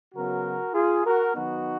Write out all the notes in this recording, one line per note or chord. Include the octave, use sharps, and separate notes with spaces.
C#3 F#3 B3 F#4 A#4
F4 G#4
F#4 A#4
D#3 F#3 B3 D#4 F#4